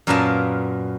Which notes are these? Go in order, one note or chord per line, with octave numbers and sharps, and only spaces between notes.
F#2 A#2 B3 A#4 F5 A5